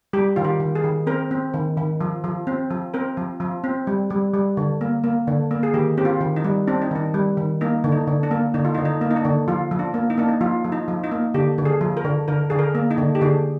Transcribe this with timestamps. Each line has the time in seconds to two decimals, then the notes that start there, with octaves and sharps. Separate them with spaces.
0.13 G3 G4
0.36 D#3 F4
0.44 G4
0.60 D#3
0.75 G#4
0.84 D#3
1.07 C4 A#4
1.31 C4
1.54 D#3
1.77 D#3
2.01 F3
2.24 F3
2.47 C4
2.70 F3
2.94 C4 A#4
3.17 F3
3.40 F3
3.64 C4
3.87 G3
4.10 G3
4.34 G3
4.57 D3
4.81 A#3
5.04 A#3
5.28 D3
5.51 A#3
5.63 G#4
5.74 D#3 G4
5.98 C4 G4
6.05 F4
6.21 D#3
6.36 D#4
6.44 G3
6.67 C4 D4
6.82 D#4
6.91 D#3 D4
7.14 G3
7.37 D#3
7.61 A#3 D#4
7.84 D3
7.92 D#4
8.07 D3
8.23 D4
8.31 A#3
8.54 D3 D#4
8.65 F4
8.74 D#4
8.78 D3
8.85 D#4
9.01 A#3
9.11 D#4
9.16 D4
9.25 D3
9.48 F3 F4
9.71 F3
9.79 D4
9.94 A#3
10.10 D#4
10.18 A#3 D4
10.28 D#4
10.41 F3 F4
10.64 F3
10.72 D#4
10.88 F3
11.04 D#4
11.12 A#3
11.34 D3 G4
11.58 D3
11.65 G#4
11.81 F3
11.97 A#4
12.05 D3
12.28 D3 A#4
12.50 D3 G#4
12.59 A#4
12.75 A#3
12.91 D#4
12.98 D3
13.15 G4
13.21 D3 G#4